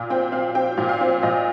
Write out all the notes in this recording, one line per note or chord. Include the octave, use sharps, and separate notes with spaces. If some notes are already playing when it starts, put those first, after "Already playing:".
Already playing: A#2
C4 G5
C4 F5
C4 G5
A#2
F5
C4
A#2 D#5